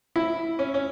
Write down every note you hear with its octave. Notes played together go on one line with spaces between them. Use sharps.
E4
C#4
C#4